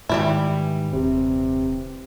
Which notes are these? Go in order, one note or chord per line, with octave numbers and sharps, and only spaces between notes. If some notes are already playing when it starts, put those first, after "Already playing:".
G#2 D#3 E3 G3 E4
D#1 C3